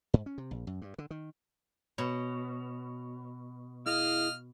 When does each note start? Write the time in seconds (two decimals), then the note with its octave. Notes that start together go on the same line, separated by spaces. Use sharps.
0.14 G#2
0.26 C#4
0.38 C3
0.51 A#1
0.67 F#2
0.82 G2
0.98 D3
1.10 D#3
1.98 B2 C#5
3.86 E4 G#4 D#5 F5 F6